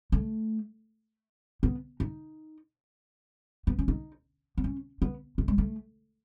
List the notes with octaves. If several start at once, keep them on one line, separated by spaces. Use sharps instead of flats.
A3
B3
D#4
B3
C#4
D#4
B3
C#4
B3
A3
G#3
A3